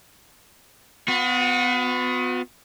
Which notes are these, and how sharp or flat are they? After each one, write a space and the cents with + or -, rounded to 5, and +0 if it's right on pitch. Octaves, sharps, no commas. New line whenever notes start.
B3 +30 F#4 -40